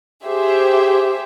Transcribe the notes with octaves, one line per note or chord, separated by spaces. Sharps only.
G4 G#4 C5 E5